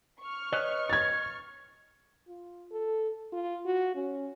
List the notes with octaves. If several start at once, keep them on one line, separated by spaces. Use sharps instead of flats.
C#6 F6
B4 C#5 D#5
G#6 A6
F4
A4
F4
F#4
C#4